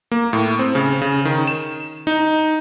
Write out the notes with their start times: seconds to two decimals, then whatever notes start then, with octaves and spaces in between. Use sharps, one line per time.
0.12 A#3
0.33 A2
0.59 C4
0.75 C#3
1.02 C#3
1.25 D#3
1.47 E7
2.07 D#4